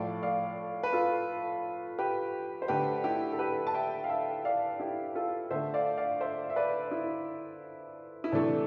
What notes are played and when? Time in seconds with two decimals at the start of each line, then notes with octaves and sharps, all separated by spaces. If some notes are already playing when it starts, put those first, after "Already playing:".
Already playing: A2 F3 A3 D5 F5
0.23 D5 F5
0.83 B4
0.93 F4 A4
1.99 G4 B4
2.62 C5
2.68 D3 A3 G4 B4
3.04 E4 G4
3.32 A4
3.39 G4 B4
3.67 A5
3.74 E5 G5
4.04 F5
4.09 E5 G5
4.45 D5 F5
4.80 E4 G4
5.15 F4 A4
5.51 D3 A3 C5 E5
5.74 D5 F5
5.97 D5 F5
6.21 C5 E5
6.50 E5
6.56 B4 D5
6.91 E4
8.24 E4
8.32 C3 E3 A3 D4